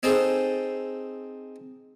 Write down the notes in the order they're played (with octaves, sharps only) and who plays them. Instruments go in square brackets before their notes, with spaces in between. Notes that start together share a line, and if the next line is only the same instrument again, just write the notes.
[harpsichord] C4 D#4 G#4 A4 C5